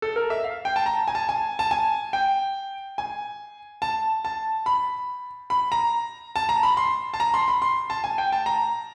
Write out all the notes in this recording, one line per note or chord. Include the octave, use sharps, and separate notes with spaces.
A4
A#4
E5
F5
G5
A5
A#5
G#5
A5
G#5
A5
G#5
G5
G#5
A5
A5
B5
B5
A#5
A5
A#5
B5
C6
A5
A#5
C6
B5
C6
A5
G#5
G5
A5
A#5